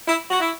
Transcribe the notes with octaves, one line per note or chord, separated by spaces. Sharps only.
E4
F#4
E4